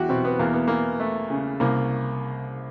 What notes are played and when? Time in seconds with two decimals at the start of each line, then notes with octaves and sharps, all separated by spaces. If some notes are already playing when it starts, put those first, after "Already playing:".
Already playing: E2 G3 F#4 G4
0.09 B2 C4
0.25 B3
0.39 E2 A#3
0.53 B3
0.68 E3 A#3
1.00 A3
1.30 C#3
1.60 C2 A#3